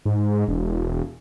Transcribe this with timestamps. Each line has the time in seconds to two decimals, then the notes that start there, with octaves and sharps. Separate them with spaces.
0.05 G#2
0.48 E1